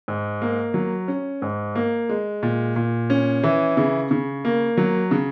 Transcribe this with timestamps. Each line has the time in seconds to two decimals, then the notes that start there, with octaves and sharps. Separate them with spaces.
0.08 G#2
0.42 A#3
0.74 F#3
1.08 C#4
1.42 G#2
1.75 A#3
2.09 G#3
2.43 A#2
2.76 A#2
3.10 C#4
3.43 E3
3.77 C#3
4.11 C#3
4.45 A#3
4.77 F#3
5.11 C#3